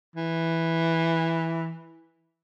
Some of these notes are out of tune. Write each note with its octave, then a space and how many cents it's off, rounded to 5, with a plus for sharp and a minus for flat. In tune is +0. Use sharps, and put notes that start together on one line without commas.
E3 -5